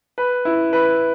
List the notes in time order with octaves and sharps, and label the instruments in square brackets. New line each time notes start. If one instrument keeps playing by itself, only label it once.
[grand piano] B4
E4
B4